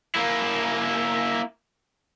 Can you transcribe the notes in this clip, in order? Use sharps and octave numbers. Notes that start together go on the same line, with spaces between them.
A#3 E4